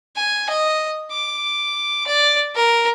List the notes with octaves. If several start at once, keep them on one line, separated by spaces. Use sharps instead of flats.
G#5
D#5
D6
D5
A#4